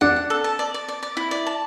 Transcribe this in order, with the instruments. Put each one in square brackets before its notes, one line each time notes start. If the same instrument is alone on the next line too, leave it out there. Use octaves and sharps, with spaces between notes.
[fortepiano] D4 [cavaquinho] F#5
[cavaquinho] F#5
A4
A5
D5
D5
D5
D5
E4
D5
A5